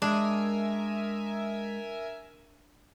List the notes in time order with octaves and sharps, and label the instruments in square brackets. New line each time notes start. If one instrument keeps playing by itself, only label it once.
[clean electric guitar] G#3 [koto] D4 [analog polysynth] A#4 E5 G#5